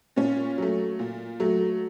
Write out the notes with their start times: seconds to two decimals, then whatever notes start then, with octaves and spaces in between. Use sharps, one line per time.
0.16 A#2 C#4
0.58 F#3 A3
0.99 A#2
1.40 F#3 A3